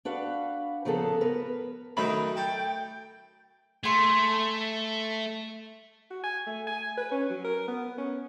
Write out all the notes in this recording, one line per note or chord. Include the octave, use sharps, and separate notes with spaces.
D4 F#4 B4 F5
C#3 F3 A#3 B3 G#4 A4
B3 A#4 B4
F#2 D#3 F#3 A3 D#4 B5
A4 G5
A3 G#4 C6
F#4
G#5
A3
G#5
B4
C#4
F#3
A#4
B3
C#4